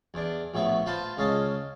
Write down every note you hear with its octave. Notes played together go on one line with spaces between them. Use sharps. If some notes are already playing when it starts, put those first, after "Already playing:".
E2 D4
A#1 A2 B3 E5 C#6
F4 B4 C5 A5 C6
C#2 C#4 D#5 F5 A5